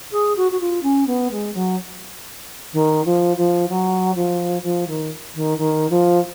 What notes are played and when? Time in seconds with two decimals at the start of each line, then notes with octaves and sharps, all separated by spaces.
0.11 G#4
0.36 F#4
0.51 F#4
0.60 F4
0.83 C#4
1.06 B3
1.31 G#3
1.54 F#3
2.72 D#3
3.05 F3
3.36 F3
3.68 F#3
4.15 F3
4.62 F3
4.87 D#3
5.34 D#3
5.58 D#3
5.90 F3